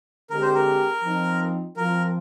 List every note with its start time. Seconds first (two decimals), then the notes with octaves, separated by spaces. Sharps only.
0.30 D3 G#3 C4 G4 A#4
0.42 C5
0.54 A#4
1.03 F3 C4 D#4
1.77 F3 C4 F4 A#4